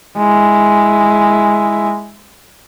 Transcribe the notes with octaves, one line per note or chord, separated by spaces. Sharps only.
G#3 E4